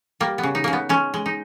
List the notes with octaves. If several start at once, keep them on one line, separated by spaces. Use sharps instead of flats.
G3 A#3
B3
C#3
D#4
C#3 A#3
B3
G#3 C#4
G#3
D#4